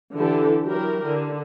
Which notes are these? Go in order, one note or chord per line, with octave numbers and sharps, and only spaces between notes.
D3 E3 E4 G4 A4
F#3 E4 G4 A#4
D3